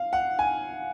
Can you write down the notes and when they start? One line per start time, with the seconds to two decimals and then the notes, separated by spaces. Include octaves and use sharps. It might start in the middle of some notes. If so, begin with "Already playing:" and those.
Already playing: F5
0.13 F#5
0.39 G#5